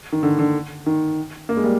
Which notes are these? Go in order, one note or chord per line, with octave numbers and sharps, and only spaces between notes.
D#3
D3
D3
D#3
A#3
G#3
G3 A#3